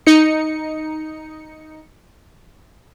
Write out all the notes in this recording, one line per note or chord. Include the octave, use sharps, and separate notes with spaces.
D#4 C#7